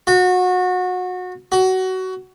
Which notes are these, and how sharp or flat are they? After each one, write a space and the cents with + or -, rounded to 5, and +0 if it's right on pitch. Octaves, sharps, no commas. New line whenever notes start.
F#4 -25
F#4 +20